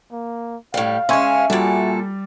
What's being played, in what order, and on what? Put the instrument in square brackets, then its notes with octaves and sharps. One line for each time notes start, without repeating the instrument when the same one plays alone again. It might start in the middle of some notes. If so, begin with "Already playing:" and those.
[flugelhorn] A#3
[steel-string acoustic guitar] A2 G3 [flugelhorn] F5
[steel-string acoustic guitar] G#3 C#4 [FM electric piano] E5 G#5 [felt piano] C6 C#6
[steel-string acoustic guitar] A#2 A4 [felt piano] G3 A6 [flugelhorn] F#4